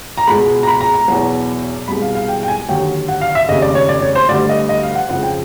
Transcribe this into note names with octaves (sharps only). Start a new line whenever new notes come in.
A#5
C#2 B2 G#3 B5
A#5
B5
A#5
A#5
E2 B2 F#3
C2 B2 G#3 B5
F5
F5
G5
G5
G#5
D#2 D3 F#3 G5
F#5
F5
E5
F1 D#2 C#3 D#5
D5
C#5
D5
C#5
C5
D2 D3 G3 D5
D#5
D#5
F5
F#5
F2 C#3 F3 G#3 F#5
G5